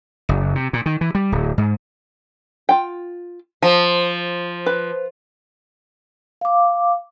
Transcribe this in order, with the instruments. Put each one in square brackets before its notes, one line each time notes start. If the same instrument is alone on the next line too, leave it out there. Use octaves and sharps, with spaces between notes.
[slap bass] F#1
C3
A#2
D#3
E3
G3
D1
G#2
[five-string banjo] F4 G5
[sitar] F3 [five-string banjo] A5
[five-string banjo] B4
[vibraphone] F5 D6